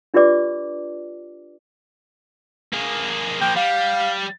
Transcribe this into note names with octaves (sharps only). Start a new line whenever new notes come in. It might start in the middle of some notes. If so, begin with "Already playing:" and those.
D4 F4 G4 B4 D5 D6
A#3 G#4
F3 A#3 G5
G3 F5